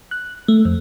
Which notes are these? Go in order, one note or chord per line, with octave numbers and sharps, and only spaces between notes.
F#6
A3
F2